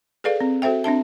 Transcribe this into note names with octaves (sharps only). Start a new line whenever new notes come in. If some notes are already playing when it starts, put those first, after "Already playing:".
G#4 A4 B4 D5 F5
C4
F#4 A4 C5 E5 G5
C4 D4 E5 A5